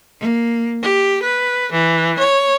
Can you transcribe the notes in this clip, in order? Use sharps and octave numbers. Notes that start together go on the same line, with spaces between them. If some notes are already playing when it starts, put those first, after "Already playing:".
A#3
G4
B4
E3
C#5